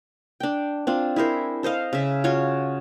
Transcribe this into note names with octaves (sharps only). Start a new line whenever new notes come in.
D4 G5
C4 D4 F4
E4 G#4 A#4 C5
A4 C5 D#5 F5
C#3 E5
F4 F#4 C#5